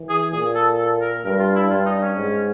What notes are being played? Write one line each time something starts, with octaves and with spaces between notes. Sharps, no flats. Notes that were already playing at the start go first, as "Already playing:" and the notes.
Already playing: E3
G#4
A#2 G#4
A4
A4
A#4
G2 A#4
F4
E4
G2 F4
D#4
C#4
G#2